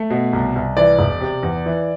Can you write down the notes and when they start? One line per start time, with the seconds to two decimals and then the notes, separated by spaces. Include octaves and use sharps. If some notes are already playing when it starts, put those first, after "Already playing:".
Already playing: A3
0.10 B2
0.33 C2
0.56 C2
0.77 E3 D5
0.99 E1
1.21 C3
1.43 E2
1.66 E3